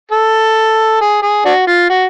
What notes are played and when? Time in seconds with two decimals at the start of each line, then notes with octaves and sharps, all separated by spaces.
0.11 A4
1.01 G#4
1.22 G#4
1.45 D4 F#4
1.67 F4
1.89 F#4